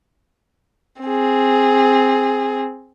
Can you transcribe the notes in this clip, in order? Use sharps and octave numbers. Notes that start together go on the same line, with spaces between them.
C4 G#4